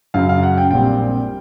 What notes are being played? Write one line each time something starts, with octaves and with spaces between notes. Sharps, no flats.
F#2 C#3 F#3 F5
F5
F#5
G5
A#1 A#2 G3 C4 G5